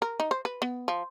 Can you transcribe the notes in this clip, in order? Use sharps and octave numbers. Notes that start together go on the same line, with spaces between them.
A#4
D#4
C5
B4
B3
F3